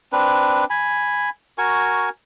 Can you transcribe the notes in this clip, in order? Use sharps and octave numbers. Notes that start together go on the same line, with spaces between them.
C4 D4 B4
G#5 B5
F#4 A#4 G#5 C#6